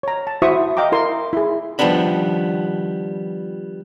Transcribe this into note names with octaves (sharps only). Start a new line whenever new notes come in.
C#5 A#5
A5
E4 F#4 C5 E5 C#6 D#6
D#5 F5 G5 A#5 D6
E4 A#4 C6
E4 G#4
D#3 F3 G3 B3 D4 B5